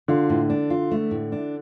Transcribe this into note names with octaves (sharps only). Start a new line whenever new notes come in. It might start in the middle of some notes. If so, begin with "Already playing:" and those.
D3 F4
A2
D4
F4
A3
A2
D4